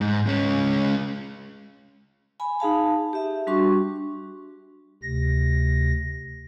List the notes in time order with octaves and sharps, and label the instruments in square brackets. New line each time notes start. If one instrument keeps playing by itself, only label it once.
[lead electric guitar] G#2
G#3 C#4
[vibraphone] G#5 B5
D#4 G#4 F5 A5
G4 E5
G3 D4 F#4 C6 C#6
[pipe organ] D2 C3 A#6